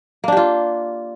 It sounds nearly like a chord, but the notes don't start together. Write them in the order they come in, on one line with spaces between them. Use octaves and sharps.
A#3 D4 G4 F4